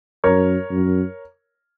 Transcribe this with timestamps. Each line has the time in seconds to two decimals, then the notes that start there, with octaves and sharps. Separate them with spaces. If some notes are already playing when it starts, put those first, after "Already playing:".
0.24 F#2 A#4 C#5
0.70 F#2